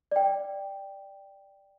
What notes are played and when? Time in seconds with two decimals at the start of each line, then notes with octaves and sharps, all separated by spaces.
0.11 D5 G5